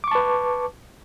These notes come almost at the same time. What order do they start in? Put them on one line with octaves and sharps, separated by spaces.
D6 C#6 A5 B4